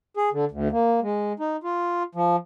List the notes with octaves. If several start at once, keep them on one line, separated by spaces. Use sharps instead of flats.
G#4
D3
D2
A#3
G#3
D#4
F4
F3